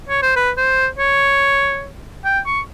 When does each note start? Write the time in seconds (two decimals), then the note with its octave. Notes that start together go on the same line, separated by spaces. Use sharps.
0.09 C#5
0.22 C5
0.36 B4
0.57 C5
0.98 C#5
2.25 G5
2.46 C#6